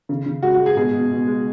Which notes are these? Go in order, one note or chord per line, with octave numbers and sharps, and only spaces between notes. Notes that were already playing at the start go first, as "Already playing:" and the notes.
C#3
C#3
G#3 F#4
F#4
G#3
G#4
B2 G#4
B2
B2
G#3